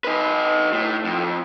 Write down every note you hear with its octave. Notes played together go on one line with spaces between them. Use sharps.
D#4 B4
A2
F2